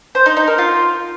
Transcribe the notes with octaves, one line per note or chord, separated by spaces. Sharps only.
C5
D#4
D#4
A#4
F4